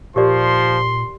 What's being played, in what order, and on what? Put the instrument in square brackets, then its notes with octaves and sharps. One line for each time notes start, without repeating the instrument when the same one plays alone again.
[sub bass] A#2 [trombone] F3 [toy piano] G4 A#4 D5 [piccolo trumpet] C6